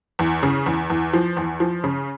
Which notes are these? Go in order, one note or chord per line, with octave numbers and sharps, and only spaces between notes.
E2
C#3
E2
E2
F3
E2
F3
C#3